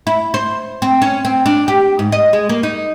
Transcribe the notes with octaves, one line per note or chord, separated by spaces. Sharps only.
E4
C5
C4
C#4
C4
D4
G4
G#2
D#5
G#3
A#3
D#4